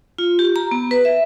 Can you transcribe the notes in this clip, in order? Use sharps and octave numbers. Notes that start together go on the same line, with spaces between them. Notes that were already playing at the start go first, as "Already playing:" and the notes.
F4
G4
A#5
B3
B4
E5